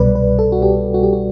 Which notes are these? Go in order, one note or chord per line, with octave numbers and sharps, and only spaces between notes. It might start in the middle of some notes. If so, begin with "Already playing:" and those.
Already playing: C2 B2 G3 B4 D5
B4
A4
F#4
G4
F#4
G4
F#4